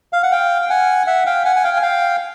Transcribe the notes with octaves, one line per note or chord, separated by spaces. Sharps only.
F5
F#5
F5 G5
G5
F#5 G#5
E5 F#5
F5 G5
F#5 G#5
G#5
F5 G5
G#5
F5 G5